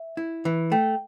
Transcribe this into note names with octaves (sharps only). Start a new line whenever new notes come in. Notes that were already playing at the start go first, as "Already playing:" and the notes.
Already playing: E5
E4
E3
A3 G5